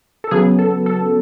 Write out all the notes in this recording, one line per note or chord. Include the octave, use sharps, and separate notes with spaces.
A4
C#3 F#3 B3 G#4
A4
A4